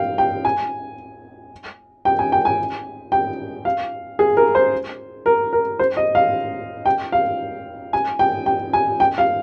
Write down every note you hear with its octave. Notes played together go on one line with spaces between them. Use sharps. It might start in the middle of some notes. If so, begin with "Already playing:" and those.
Already playing: F5 G5
G5
G#5
G5
G#5
G5
G#5
G5
F5
G#4
A#4
C5
A#4
A#4
C5
D#5
F5
G5
F5
G#5
G5
G5
G#5
G5
F5